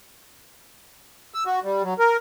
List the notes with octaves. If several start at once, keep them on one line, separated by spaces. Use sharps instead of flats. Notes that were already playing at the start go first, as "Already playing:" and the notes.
E6
F#4
G3
F#3
A#4